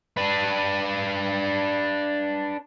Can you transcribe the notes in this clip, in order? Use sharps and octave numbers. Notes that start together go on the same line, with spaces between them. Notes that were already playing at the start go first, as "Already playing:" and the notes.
D4 B4